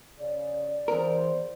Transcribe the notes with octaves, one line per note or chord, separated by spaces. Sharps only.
C#3 D5
E2 A#4 C5